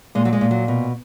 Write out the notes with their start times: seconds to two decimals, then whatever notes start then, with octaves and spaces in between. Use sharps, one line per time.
0.15 A#2 G#3
0.25 F#3
0.33 G#3
0.41 A#2
0.51 F#3
0.68 B2